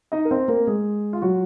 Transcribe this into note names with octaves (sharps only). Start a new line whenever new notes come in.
D#4 D#5
A#4
C4 C5
A#3 A#4
G#3 G#4
F4
F#3 F#4